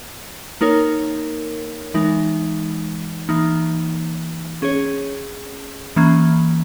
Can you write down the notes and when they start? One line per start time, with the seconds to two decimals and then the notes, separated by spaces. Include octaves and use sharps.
0.61 A#3 D#4 A#4 C#5
1.94 E3 G#3 D#4
3.29 E3 A#3 D#4
4.62 C#4 G#4 C#5
5.96 E3 A#3 C#4